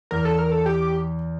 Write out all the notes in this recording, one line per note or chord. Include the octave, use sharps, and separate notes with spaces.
E2 A#4
A4
A#4
A4
G4